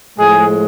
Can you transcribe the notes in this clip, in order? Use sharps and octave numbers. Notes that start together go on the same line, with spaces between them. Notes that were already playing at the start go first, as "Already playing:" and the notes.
A2 F3 G#3 G#4